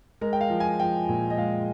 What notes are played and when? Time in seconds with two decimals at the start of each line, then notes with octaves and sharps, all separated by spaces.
0.21 G#3 A#4
0.33 G5
0.41 F5
0.50 F3
0.60 G#5
0.80 F3 G5
1.09 A#2
1.30 D#5
1.37 G#3 F5